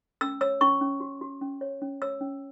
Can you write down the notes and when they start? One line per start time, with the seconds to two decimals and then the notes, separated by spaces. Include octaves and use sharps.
0.21 C#4 E6
0.41 C#5 E6
0.61 C#4 C#6
0.81 C#4
1.00 F#4
1.21 F#4
1.41 C#4
1.61 C#5
1.82 C#4
2.02 C#5 E6
2.21 C#4